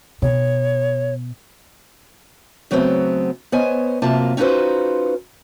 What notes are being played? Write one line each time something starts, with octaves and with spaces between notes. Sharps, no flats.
B2 C#5
C#3 F#3 A3 B3 C4
B3 C5 C#5 D#5 G#5
F#2 C3 A#3 F4 A5
C#4 D#4 F4 F#4 B4 C5